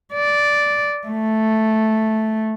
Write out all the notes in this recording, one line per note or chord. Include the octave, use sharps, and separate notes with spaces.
D5
A3